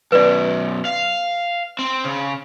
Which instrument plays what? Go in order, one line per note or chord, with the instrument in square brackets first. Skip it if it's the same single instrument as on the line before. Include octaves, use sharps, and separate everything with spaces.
[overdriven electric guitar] F#2 B2 [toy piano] B4 D5
[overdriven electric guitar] F5
C4
C#3